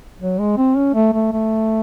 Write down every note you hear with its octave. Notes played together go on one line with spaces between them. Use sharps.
F#3
G#3
C4
C#4
A3
A3
A3